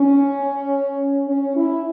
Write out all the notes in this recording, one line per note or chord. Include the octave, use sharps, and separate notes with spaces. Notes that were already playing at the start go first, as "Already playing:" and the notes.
Already playing: C#4
C#4
E4